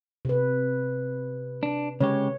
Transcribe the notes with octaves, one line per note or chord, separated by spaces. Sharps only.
C3 B4
D4
C#3 G#3 G4 C#5